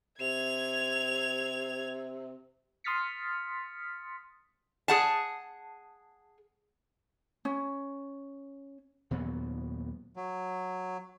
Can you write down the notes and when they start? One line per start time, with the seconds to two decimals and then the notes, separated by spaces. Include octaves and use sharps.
0.20 C3 G#6 F7
2.84 C6 D#6 F6 A6 B6 C#7
4.88 G#4 F#5 A5
7.45 C#4
9.11 D#2 A#2 F#3 B3
10.16 F#3